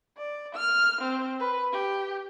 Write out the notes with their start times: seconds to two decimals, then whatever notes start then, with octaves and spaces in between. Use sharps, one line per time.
0.17 D5
0.54 F6
1.01 C4
1.40 B4
1.73 G4